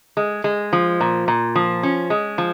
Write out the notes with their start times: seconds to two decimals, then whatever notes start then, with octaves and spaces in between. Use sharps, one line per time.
0.17 G#3
0.44 G#3
0.73 F3
1.01 A#2
1.28 A#2
1.55 F3
1.83 C#4
2.10 G#3
2.38 F3